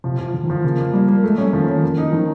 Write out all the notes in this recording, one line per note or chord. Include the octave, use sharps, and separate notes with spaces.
C3 F3
F3
D3 F3
D#3
D3 F3
C#3 A#3
A#3
G3 A#3
A#3
G#3 A3
G3 C#4
D#3 F3
C#4
A#3
D#4
D#3 F3